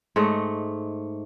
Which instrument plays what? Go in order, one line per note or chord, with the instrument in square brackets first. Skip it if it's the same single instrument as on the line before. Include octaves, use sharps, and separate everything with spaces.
[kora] G#2 A3 C#5 D#5